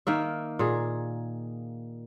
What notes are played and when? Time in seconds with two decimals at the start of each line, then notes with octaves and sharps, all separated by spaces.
0.07 D#3 A#3 E5
0.59 A#2 G#4